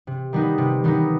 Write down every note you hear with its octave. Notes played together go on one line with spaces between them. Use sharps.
C3
D#3 G3 B3 D#4
C3
D#3 G3 B3 D#4